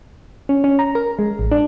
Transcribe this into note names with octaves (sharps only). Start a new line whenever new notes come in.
C#4
C#4
A#5
A#4
G#3
A1
D4